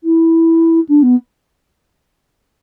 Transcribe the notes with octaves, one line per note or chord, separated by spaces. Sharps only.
E4
D4
B3